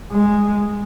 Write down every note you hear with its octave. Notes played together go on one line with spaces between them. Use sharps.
G#3